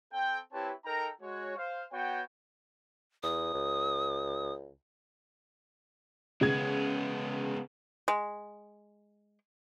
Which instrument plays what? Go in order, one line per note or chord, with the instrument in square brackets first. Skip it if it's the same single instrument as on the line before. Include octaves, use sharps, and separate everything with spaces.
[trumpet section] C4 A4 G5
C4 E4 G4 B4 C#5 A5
D#4 A4 A#4 G5 A#5
G#3 F#4 C#5
C5 F5
B3 F#4 C#5 G5
[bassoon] E2 [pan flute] D#6
[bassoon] C#2
[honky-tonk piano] C#3 G#6 [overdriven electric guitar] G#3 B3
[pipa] G#3